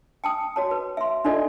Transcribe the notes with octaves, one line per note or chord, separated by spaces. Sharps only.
G5 A5 D#6
F#4 C#5 A5
B4
E5 C6
D4 D#4 F4 A4 D5 D#5